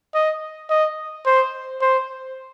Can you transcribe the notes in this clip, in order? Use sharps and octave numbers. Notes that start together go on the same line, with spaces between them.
D#5
D#5
C5
C5